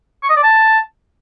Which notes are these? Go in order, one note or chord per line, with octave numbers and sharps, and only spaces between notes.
C#6
D#5
D5
A5